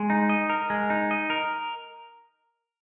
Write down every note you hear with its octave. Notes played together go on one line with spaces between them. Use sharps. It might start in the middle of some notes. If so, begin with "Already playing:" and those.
Already playing: G#3
D#4
D#5
A#4
G#3
D#4
D#5
A#4